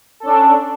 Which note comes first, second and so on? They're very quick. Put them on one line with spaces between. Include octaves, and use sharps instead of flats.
A4 C#4 D4